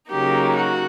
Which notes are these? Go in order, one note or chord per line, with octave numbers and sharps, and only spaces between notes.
C#3 F#3 A#3 D#4 G4
F#4